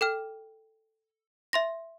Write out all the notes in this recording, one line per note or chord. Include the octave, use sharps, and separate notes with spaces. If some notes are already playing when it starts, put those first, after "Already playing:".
A4 G5 F6
E5 C6 A#6